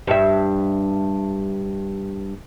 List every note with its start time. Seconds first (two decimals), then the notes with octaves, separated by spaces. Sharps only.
0.07 G2 E5